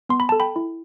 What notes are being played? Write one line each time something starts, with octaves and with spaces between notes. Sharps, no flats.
B3 C6
B5
A4 A5
G5 B5
E4